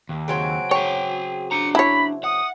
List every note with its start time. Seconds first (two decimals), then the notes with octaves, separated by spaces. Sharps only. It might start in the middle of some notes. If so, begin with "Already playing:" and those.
0.09 D#2
0.28 C#3 F#3 C4 D7
0.71 G#4 C#5 G5
1.51 D4 A#5 C#7
1.75 E4 C#5 B5
2.24 F#5 D#6